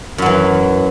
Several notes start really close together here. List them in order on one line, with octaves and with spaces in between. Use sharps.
F#2 F#3 E3